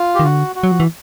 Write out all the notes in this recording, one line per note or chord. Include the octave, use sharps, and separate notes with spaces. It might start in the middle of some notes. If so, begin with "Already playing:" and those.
Already playing: F4
G4
D#3
D3 F#4
F#4
F#3
F3
E3